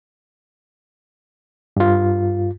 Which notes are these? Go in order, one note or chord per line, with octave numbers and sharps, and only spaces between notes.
G2 F4